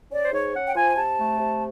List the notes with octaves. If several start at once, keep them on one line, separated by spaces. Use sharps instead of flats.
C#4 D5
C5
G#2 C#5
C#4 F#5
G5
F3 G#5
C3 A5
A3
C3